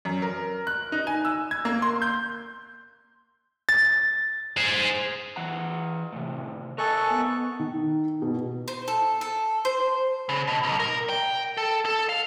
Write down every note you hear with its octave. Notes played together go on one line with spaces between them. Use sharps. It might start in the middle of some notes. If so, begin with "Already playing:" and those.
F#2
A#4
F#6
D#4
G#5
E6
G#6
A#3
C6
G6
A6
G#4 C5
E3 F#5 A#5
A2 C3
A4 A#4 D#5 G#5 C#6 F#6
B3
D#3
B2
C5
A4
A4
C5
C#3
B2
B1
A#4
G5
A4
A4
F5